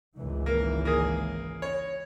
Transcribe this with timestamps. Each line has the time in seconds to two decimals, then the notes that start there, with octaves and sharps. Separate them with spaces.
0.18 G#1 C#2 E3
0.46 A#3
0.85 A#3 G#4
1.62 C#5